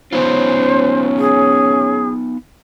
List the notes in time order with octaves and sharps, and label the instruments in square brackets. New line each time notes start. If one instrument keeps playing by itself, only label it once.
[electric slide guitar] B3 D#4 F4 [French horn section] C#4 [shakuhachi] C5
[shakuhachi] G#4